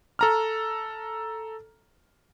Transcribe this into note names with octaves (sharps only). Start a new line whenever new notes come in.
A4 A#5 F6